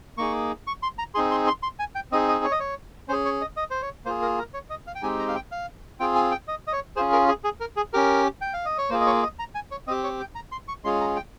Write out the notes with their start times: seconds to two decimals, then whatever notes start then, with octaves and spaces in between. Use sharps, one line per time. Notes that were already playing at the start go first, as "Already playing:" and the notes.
0.18 A#3 D#4 G#4 C#6
0.67 C#6
0.83 C6
0.99 A#5
1.15 C4 D#4 G#4 C6
1.31 C6
1.47 C6
1.63 C6
1.79 G#5
1.95 G5
2.12 C4 D#4 G#4 D#5
2.28 D#5
2.44 C#5
2.52 D#5
2.60 C#5
3.08 C#4 C5
3.12 G#4
3.25 C#5
3.41 D#5
3.57 D#5
3.71 C5
3.82 C#5
4.05 A#3 F4 G#4 C5
4.22 A#4
4.38 A#4
4.54 C#5
4.70 D#5
4.87 F5
4.95 G5
5.02 G#3 C4 D#4 G4 G#5
5.19 A#5
5.28 F5
5.35 G5
5.52 F5
6.00 C4 F4 G#4 G5
6.15 G#5
6.31 G5
6.48 D#5
6.67 D#5
6.73 C#5
6.96 C#4 F4 G#4 C5
7.12 A#4
7.28 G#4
7.44 G#4
7.60 A#4
7.77 G#4
7.93 C#4 G4 A#4
8.41 G5
8.54 F5
8.65 D#5
8.78 C#5
8.90 A#3 F4 G#4 C5
9.01 D#5
9.06 C#5
9.23 D#5
9.39 A#5
9.55 G#5
9.71 C#5
9.87 C4 D#5
9.91 G4
10.04 C#5
10.20 G5
10.35 A#5
10.52 C6
10.68 C#6
10.84 G#3 C#4 F4 G#4 C6
11.01 A#5
11.16 G5